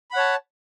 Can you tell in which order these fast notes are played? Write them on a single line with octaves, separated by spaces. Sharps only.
B5 F#5 C#5 A5